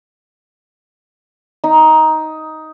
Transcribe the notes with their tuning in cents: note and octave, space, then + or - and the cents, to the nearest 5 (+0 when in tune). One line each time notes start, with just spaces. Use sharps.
D#4 +10